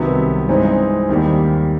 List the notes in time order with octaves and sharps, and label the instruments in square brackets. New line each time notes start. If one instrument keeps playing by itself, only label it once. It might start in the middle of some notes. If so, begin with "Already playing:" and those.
Already playing: [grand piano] C2 C3 D#3 F#3 B3
G2 E3 G#3 C4 D#4
D#2 D#3 G3